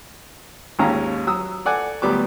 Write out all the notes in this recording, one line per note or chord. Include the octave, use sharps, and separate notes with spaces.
G#1 D#2 C#4 F5 A#5
F#3 D#6 E6
A4 D5 F#5 G#5
D2 F#3 G3 B3 D6